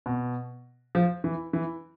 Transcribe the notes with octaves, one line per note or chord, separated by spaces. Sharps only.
B2
F3
E3
E3